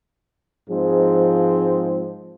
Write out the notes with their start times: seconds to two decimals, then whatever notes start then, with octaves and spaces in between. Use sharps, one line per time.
0.70 G#2 F3 G#3 C4